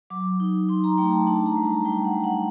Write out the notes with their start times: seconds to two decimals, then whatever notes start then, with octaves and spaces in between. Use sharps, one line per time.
0.10 F#3 D6
0.40 D#4
0.69 D#4 C6
0.84 A#5
0.98 A3 G5
1.13 A5
1.27 D4 A5
1.46 A#5
1.56 G3
1.65 A5
1.85 G3 G5
2.05 F#5
2.14 G3
2.24 F#5